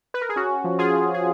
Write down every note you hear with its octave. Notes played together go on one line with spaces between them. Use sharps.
B4
A#4
G#4
C#4 F#4
F3
F4 G#4
F3
G#4